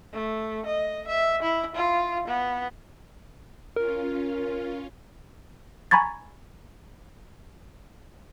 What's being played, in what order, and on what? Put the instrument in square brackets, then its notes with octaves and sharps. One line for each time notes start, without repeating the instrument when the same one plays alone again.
[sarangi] A3
D#5
E5
E4
F4
B3
[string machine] C#4 F4 [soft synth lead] A#4
[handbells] G#5 A#5 B5 C#6 G#6 A6